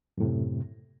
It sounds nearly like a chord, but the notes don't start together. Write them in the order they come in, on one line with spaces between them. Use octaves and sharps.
F#2 A2 C3